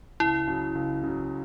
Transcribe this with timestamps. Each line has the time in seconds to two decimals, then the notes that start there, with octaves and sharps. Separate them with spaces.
0.20 C#2 E4
0.48 C#3 F#3
0.75 C#2
1.03 C#3 F#3